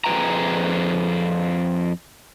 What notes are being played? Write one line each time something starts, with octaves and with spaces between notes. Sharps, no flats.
F2 G#4 B4 G5 A#5